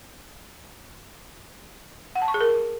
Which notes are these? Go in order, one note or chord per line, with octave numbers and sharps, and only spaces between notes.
F#5
A5
C#6
G#4
A#4